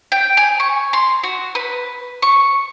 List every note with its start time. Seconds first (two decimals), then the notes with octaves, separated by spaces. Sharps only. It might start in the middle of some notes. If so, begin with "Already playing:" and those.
0.12 G5
0.37 G#5
0.60 C#6
0.93 C6
1.23 F#4
1.55 B4
2.22 C#6